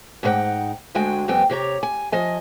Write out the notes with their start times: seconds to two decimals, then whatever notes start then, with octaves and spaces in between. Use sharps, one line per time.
0.23 G#2 D#4 F4 C#5 F#5 G5
0.95 D2 D3 G#3 F#4 G5 G#5
1.28 F2 G3 B3 C4 G5 G#5
1.49 C3 G4 C#5 A#5
1.83 G#5
2.12 F3 D#5 G#5